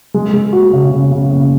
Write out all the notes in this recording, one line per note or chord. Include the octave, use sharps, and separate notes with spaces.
G#3
G#3
F#4
C#3
C#3
C#3
C#3